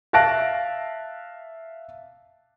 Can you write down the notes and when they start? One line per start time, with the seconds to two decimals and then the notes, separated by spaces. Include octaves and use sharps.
0.13 E5 F5 A5 F#6 A#6 D7